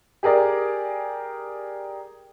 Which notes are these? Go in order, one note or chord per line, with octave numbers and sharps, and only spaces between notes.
G4 G#4 A#4 D5